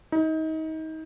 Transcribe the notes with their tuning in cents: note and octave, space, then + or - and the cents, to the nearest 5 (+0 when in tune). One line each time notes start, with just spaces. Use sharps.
D#4 +30